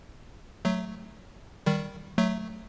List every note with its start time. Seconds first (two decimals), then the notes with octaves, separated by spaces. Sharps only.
0.65 F#3 A3
1.66 D#3 G3
2.18 F#3 A3